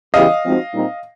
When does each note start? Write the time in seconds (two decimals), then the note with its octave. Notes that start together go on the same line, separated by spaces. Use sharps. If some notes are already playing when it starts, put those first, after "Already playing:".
0.13 E2 C#3 E3 G3 D#5 F5
0.44 F3 G#3 C4 D#4 F#4
0.73 A#2 G3 C4 D#4